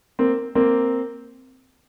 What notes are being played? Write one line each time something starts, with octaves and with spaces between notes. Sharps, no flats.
A#3 C4
A#3 C4